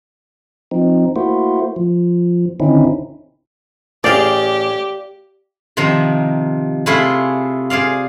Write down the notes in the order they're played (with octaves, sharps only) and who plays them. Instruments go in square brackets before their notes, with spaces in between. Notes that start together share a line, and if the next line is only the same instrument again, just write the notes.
[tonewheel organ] F3 C4 D#4
A3 A#3 E4 F#4 C5
F3
D3 D#3 C4 C#4 D#4 E4
[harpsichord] A1 G#4 [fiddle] G4 [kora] D5 F5 G5
[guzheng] C3 D#3 F3 C5 A#5
C3 A3 E4 F4 G#4 C5
G#4 C5 D5 F5